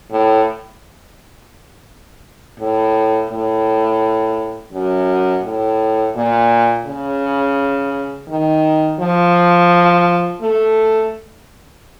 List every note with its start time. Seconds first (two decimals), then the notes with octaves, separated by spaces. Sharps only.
0.11 A2
2.60 A2
3.30 A2
4.73 F#2
5.44 A2
6.16 A#2
6.86 C#3
8.28 D#3
9.00 F3
10.42 A3